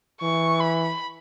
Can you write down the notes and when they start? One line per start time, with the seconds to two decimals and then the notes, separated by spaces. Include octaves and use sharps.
0.21 E3 C#6
0.60 B5